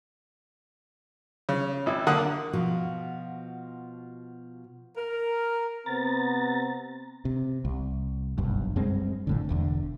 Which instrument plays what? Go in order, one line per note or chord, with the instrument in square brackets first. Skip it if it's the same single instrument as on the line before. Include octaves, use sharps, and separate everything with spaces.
[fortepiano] C#3
G#1 E4
D3 A#3 F#5 D#6 F#6
[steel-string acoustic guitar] B2 F3 F4 F#4
[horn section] A#4
[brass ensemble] C3 B3 C4 [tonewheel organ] A#5 A6
[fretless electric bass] C3
C2
F#1 B1 G2
F#2 G3 G#3 C4
A#1 A2 D3
E1 E2 D3